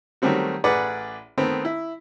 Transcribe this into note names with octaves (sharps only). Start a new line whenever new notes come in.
D#3 F#3 G3 A3 C4 F#4
A1 G#4 B4 D5 F#5 D6
D#3 A3 B3 C4
E4